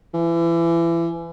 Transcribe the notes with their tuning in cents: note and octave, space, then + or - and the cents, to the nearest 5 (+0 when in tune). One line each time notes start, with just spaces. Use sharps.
E3 +30